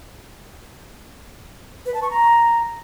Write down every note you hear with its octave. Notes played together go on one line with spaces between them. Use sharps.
B4
A5
C#6
A#5